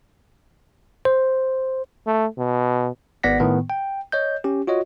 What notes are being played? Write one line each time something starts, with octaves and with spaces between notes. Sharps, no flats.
C5
A3
B2
G#1 B3 D5 F#5 A#6 B6
A2 D#3 B3
G5
C#5 D#5 G6
C#4 G4
F4 F#4 C#5 D#5